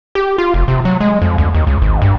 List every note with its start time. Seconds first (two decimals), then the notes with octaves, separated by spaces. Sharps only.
0.15 G4
0.38 F4
0.54 F1
0.68 C3
0.85 F#3
1.00 G#3
1.22 F2
1.38 D2
1.54 D#2
1.67 C#2
1.82 G#1
2.02 G2